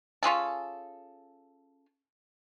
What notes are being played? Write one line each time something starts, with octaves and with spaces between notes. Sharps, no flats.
C#4 F4 G#4 A4